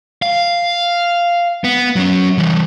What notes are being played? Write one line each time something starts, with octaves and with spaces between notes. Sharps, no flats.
F5
B3
F#3 C#4
E3 G3